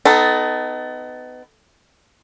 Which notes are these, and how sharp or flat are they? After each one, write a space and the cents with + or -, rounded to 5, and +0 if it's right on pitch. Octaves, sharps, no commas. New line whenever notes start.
B3 +30 D#4 +0 A4 +0